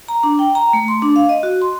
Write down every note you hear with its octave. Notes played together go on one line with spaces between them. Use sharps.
A#5
D4
G5
A#5
A3
C6
D4
F5
D#5
F#4
C6